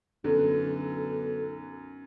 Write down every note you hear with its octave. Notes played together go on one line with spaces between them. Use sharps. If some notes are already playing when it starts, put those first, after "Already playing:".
B1 F#2 D3